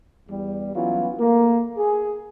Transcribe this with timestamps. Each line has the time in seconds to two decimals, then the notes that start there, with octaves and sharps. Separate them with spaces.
0.29 E2 G3
0.75 E3 F#3 B3 C#4 F4
1.18 A3 A#3
1.76 G#4